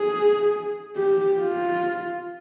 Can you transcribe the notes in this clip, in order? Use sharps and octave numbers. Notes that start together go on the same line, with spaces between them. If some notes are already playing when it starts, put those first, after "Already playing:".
Already playing: G#4
G4
F4